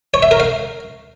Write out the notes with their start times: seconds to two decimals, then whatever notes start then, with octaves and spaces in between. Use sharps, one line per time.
0.14 C#5
0.22 E5
0.31 A#4
0.40 F5